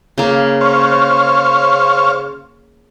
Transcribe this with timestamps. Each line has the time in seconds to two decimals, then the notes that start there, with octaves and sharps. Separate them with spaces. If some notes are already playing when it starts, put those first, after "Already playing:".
0.18 C#3 A#3
0.61 C5 C#5 F5